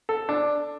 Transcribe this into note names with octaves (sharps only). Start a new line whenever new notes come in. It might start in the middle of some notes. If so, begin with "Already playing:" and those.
A4
D4